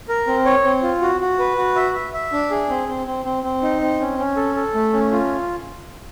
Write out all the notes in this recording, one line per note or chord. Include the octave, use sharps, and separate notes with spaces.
A#4
C4
C#5
C4
F4
F#4
F#4
B4
F#4
E5
E5
E5
D4
G#4
C4
C4
C4
C4
C4
D#4
C4
C#4
C#4
A4
A4
A3
C#4
F4